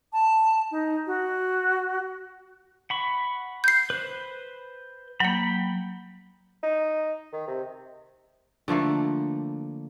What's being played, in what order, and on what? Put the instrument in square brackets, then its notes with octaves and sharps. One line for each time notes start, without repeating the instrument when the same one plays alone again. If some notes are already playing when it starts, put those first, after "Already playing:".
[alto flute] A5
D#4
F#4
[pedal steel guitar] F#5 B5 C#6
[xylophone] G6 C7
[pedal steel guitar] B4 C5
[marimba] F#3 A#3 [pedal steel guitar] G5 B5
[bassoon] D#4
D#3
C3
[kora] D3 F3 A3 A#3